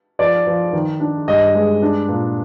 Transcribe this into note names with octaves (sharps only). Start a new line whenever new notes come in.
F3 D5
F3
D#3
D4
G2 D#5
G#3
D4
A#2